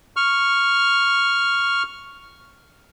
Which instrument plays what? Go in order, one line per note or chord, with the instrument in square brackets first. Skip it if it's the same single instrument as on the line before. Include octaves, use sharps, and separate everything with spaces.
[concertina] C#6 F6